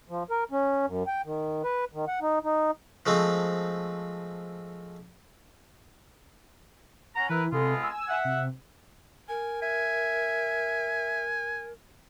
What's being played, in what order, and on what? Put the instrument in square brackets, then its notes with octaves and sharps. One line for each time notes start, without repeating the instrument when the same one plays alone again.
[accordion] F3
A#4
C#4
F#2
G5
D#3
B4
D#3
F#5
D#4
D#4
[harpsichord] F3 G#3 A3 C4
[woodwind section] C#4 F#5 A#5
[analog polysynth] E3 [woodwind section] E4 A#4 B4
[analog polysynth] C3 A4 [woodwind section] G#3 B3 F4
[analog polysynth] G#5 E6
[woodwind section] E5 F#5
[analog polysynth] C3
[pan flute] A#4 [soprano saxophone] G#5
[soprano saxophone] E5 [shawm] G#5